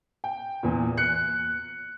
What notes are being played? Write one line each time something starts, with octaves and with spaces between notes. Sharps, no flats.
G5
E2 A#2
F#6 C#7